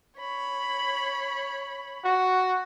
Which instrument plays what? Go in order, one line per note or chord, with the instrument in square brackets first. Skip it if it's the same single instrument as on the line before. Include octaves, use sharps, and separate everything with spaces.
[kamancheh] C#5 B5
[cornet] F#4